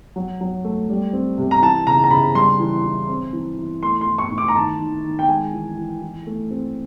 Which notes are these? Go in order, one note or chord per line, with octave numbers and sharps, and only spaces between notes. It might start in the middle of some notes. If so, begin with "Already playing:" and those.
F#3
F#3
A3
G3
C4
C3
A#5
E3 A5
C#3 A#5
A#5
C#3 B5
G3 C6
E3
E3
C4
E3
E3
A3 C6
C6
E3
C#6
A2
D6
A#5
D#3 A5
D#3
D#3
G5
G#3 G#5
E3
E3
E3
A3
C4